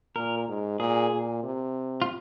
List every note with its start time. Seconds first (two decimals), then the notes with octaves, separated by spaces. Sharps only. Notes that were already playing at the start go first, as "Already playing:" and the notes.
0.16 A#2 A#4
0.48 G#2
0.79 A#2 G#4
1.11 A#2
1.43 C3
2.02 F4